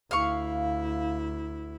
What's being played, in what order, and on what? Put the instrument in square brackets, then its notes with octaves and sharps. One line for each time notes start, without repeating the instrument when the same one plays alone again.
[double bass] D2 E4 [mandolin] F5 C#6